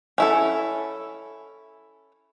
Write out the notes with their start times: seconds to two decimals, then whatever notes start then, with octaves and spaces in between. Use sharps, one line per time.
0.18 C#4 E4 A4